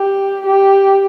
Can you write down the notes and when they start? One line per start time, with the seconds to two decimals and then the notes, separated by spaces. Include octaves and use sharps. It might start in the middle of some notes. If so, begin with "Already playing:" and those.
Already playing: G4
0.46 G4